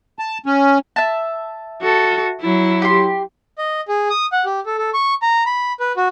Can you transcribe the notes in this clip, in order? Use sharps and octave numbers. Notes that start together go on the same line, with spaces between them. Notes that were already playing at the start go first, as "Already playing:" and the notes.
A5
C#4
E5 A5
F#4 A4
F#3 E4
G4 C6
D#5
G#4
D#6
F#5
G4
A4
A4
C#6
A#5
B5
B4
F#4